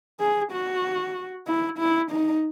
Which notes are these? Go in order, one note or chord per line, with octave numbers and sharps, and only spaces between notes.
G#4
F#4
E4
E4
D#4